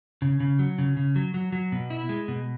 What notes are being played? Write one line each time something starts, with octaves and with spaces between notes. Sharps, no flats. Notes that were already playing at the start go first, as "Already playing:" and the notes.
C#3
C#3
F#3
C#3
C#3
F#3
F#3
F#3
B2
E4
G#3
B2